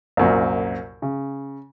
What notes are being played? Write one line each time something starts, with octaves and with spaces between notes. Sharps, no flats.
C2 F#2 A#2
C#3